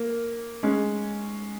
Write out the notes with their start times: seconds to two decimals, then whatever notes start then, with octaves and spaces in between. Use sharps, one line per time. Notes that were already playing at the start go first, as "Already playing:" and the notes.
Already playing: A#3
0.63 G#3 C#4